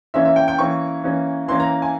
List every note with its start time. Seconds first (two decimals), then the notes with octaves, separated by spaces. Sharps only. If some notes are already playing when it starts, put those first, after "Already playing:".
0.14 E3 A#3 C#4 E5
0.25 E5
0.36 G5
0.48 G5
0.58 E3 A#3 C#4 C#6
1.04 E3 A#3 C#4
1.48 E3 A#3 C#4 C6
1.60 A#5
1.82 G#5